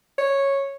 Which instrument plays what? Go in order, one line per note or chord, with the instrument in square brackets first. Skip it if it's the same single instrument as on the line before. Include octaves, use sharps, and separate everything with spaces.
[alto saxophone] C#5